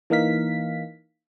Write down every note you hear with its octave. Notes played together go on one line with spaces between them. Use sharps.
E3 A#3 D#4 F5 B6